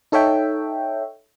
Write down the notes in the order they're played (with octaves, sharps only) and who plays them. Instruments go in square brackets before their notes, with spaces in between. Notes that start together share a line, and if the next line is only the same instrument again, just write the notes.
[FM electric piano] D#4 A4 C#5 E5 G5